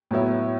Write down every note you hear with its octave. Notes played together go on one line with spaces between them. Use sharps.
A2 F#3 B3 E4